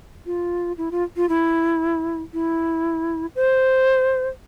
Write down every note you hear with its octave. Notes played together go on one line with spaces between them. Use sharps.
F4
E4
F4
F4
E4
E4
C5